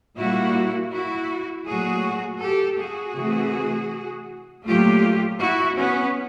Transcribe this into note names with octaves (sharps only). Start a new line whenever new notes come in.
A#2 G3 A#3 E4 F#4
E4 F#4
A#2 F#3 A3 F#4 G#4
G4 A4
F#4 G#4
C3 E3 A3
A#2 F#3 A3 F4 G4
E4 F#4
B3 C#4